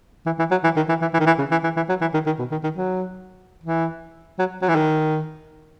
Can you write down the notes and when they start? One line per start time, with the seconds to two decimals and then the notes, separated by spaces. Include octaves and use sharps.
0.26 E3
0.39 E3
0.51 F#3
0.64 E3
0.76 D#3
0.89 E3
1.01 E3
1.14 E3
1.20 D#3
1.26 E3
1.38 C#3
1.51 E3
1.64 E3
1.76 E3
1.89 F#3
2.01 E3
2.13 D#3
2.26 D#3
2.39 B2
2.51 D#3
2.63 D#3
2.76 F#3
3.63 E3
4.39 F#3
4.62 F#3
4.69 E3
4.75 D#3